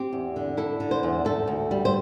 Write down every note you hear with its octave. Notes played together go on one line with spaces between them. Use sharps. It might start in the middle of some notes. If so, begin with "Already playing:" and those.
Already playing: C4 G4
E2
D3
E4 A4
D3
C5
E2
D2 A4
D2
G3
C5